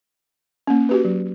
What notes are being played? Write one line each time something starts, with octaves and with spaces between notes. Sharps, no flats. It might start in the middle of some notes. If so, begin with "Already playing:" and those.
A#3 C#4
F#4 G4 B4
F#3